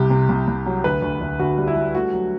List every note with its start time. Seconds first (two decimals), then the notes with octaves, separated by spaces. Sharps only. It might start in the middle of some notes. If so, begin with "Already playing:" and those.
Already playing: C2 C3 G4
0.10 C3
0.29 C2
0.48 C2
0.66 F#3
0.84 D2 B4
1.02 D2
1.21 D2
1.40 D2 F#4
1.58 G3
1.68 E4
1.76 G3
1.95 A3 F#4
2.13 F#3